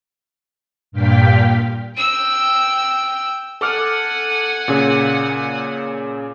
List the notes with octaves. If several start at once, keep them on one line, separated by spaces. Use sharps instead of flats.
G2 A#2 F5 G5 B6
G5 E6
A4 F#5 G#5 D6 F6
A#2 C#3